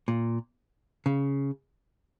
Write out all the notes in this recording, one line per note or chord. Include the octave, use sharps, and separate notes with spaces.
A#2
C#3